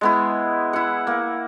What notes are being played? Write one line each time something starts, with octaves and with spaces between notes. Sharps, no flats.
G#3 B3 E4
E4 F#5
A#3